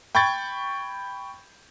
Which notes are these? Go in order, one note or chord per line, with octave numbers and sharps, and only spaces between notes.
G5 B5 C#6 G#6 A6